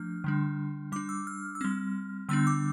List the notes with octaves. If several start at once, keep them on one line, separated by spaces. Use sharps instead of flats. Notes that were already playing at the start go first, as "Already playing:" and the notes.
Already playing: F3 A3 D4 F6
D3 G3 D4
G3 D4 D6
E6
F6
E6
G3 C4 F6
D3 G3 B3 D4 E6
D6